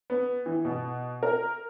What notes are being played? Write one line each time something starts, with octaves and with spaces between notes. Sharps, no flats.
B3
E3
B2
A#4